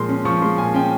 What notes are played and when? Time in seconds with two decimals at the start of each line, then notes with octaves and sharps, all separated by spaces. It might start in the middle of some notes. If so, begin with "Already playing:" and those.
Already playing: A#2 F3 G#3 C6
0.09 C#4
0.25 F3 C#6
0.42 G#3 C6
0.58 A#2 G#5
0.74 C#4 G5